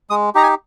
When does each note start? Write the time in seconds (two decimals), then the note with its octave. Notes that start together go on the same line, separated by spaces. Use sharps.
0.10 G#3 D#6
0.35 D#4 G4 A#5
0.43 G#5